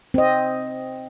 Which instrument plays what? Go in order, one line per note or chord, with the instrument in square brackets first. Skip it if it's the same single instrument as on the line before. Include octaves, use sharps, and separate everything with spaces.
[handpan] C4 D#5